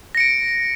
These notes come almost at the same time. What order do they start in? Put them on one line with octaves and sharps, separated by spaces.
A#6 C#7 D7